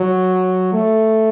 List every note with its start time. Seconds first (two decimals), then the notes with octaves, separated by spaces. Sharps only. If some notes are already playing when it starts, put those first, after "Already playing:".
Already playing: F#3
0.73 A3